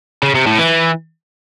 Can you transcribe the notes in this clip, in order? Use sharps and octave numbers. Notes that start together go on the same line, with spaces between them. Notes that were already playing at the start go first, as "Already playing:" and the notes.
C#3
C3
A2
E3